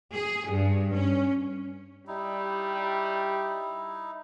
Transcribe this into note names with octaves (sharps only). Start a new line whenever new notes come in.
G#4
G2
C#4
G3 D#4 E4